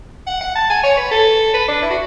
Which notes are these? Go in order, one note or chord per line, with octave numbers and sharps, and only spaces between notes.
F#5
F#5
A5
G#5
C#5
B4
A4
B4
D4
E4
F#4